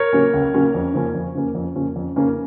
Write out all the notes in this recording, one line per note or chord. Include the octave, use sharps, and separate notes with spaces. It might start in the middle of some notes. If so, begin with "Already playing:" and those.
Already playing: A#4 C#5
C#3 F#3 A#3 C#4
C#2
C#3 F#3 A#3 C#4
F2
C#3 F3 A#3 C#4
F2
C#3 F3 A#3 C#4
F2
C#3 F3 A#3 C#4
F2
C#3 F3 A#3 C#4